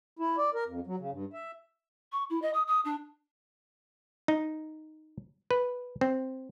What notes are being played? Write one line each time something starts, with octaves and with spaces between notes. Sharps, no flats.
E4
D5
A#4
F2
F#3
C#3
G2
E5
C#6
E4
D#5
D#6
D#6
D4
D#4
B4
C4